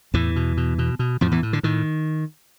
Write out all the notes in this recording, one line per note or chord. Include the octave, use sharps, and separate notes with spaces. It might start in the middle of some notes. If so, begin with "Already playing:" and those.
E2 A2 E3
B2
B2
B2
B2
F2 A2 F3
E2 E3
A2
D3
A2 D#3